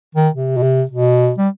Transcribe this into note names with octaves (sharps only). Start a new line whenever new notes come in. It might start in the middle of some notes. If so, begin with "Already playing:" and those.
D#3
C3
B2
C3
B2
G3